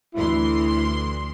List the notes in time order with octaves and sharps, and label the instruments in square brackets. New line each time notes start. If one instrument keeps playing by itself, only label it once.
[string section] D2 E3 C6 [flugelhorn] E4